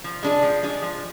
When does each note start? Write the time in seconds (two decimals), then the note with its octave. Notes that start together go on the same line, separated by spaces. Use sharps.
0.04 F3
0.23 G#3 D4 G#4
0.42 F3
0.63 G#3 D4 G#4
0.82 F3